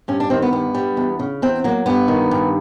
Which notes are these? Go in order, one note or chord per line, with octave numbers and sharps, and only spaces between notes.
G2 C#4
D4
D#3 C4
B3
G2 B3
G3
E2
C#3
E2 C4
F#3 A#3
G2 B3
D#3
G2